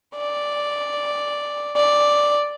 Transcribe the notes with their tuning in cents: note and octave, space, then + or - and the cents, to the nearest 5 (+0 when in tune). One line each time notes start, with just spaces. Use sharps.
D5 +0
D5 +0